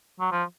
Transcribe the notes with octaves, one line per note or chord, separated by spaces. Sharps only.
F#3
F3